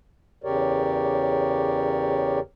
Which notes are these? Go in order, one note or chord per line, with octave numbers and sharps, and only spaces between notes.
E2 C#3 G4 A#4 C#5 D5